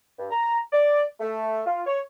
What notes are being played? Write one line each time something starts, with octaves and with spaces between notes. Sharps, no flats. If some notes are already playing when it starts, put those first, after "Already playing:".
G2
A#5
D5
A3
F4
C#5